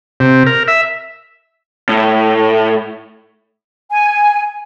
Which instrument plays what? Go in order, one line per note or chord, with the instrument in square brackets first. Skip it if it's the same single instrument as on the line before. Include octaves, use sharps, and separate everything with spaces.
[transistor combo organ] C3
A#4
E5
[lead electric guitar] A2
[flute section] G#5